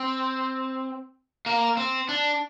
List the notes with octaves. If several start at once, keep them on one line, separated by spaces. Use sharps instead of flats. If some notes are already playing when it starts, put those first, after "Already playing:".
Already playing: C4
A#3
C4
D4